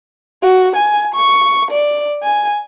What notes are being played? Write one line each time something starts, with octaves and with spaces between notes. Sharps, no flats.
F#4
G#5
C#6
D5
G#5